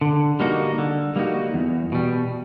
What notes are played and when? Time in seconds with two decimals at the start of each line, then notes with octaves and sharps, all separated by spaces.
0.01 D3
0.40 G3 A#3 D#4 F#4
0.78 D3
1.16 G3 A#3 D#4 F#4
1.54 E2
1.92 B2 G3